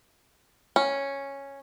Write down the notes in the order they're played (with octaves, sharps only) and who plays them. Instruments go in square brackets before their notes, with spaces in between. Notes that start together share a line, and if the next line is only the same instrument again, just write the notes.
[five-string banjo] C#4